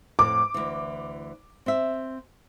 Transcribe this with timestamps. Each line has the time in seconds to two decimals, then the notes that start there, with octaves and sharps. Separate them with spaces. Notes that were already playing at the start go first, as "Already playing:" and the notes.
0.19 F2 A2 D6
0.54 D2 E3
1.66 C4 E5